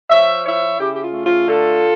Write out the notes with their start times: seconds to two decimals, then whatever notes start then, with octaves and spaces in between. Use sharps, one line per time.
0.09 F3 C#5 E5
0.44 E4 C#5 E5
0.78 C#3 E4 G4
0.93 G4
1.01 F4
1.13 A3
1.24 F4
1.48 D3 F4 A4